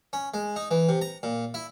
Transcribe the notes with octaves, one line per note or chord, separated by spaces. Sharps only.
C#4
G#3
D#4
E3
C3
A#5
A#2
E4